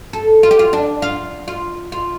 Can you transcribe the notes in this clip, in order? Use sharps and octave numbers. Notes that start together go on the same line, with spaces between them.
A4
F4
G4
F4
D4
F4
F4
F4